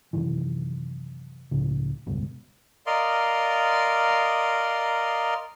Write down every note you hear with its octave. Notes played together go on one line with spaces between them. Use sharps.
F#2 C3 D#3 E3
C#2 A2 C#3 F3
E1 C#2 G2 B2
A#4 D5 D#5 F5 C6